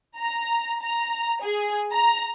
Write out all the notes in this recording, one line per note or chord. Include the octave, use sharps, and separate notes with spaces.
A#5
A#5
G#4
A#5